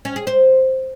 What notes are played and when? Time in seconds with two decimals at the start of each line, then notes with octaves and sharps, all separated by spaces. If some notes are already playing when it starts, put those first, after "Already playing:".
0.05 C#4
0.16 G#4
0.27 C5